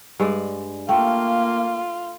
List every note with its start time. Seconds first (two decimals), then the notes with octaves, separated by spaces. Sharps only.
0.20 G2 G#3 D5
0.89 A3 A#3 F4 G5